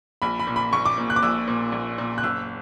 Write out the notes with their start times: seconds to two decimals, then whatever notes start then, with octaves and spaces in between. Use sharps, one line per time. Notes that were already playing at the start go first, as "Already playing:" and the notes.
0.22 A#1 B5
0.39 B5
0.47 A#2
0.56 B5
0.73 A#1 C#6
0.85 D6
0.98 A#2
1.10 F#6
1.16 D6
1.23 A#1 E6
1.48 A#2
1.72 A#1
1.98 A#2
2.18 F#6
2.23 F#1 E6